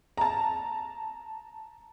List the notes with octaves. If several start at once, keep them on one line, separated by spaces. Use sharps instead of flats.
A5 A#5